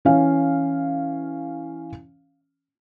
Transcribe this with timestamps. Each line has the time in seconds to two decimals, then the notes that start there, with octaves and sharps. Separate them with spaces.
0.05 E3 C#4 F5